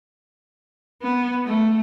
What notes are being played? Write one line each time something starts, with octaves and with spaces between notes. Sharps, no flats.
B3
A3